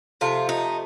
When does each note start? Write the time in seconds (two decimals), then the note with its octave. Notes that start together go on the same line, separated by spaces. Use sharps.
0.21 C3 F3 A3 F4
0.49 D#4